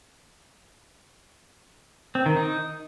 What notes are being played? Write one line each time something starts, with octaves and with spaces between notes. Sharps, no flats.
C4
D#3
D#4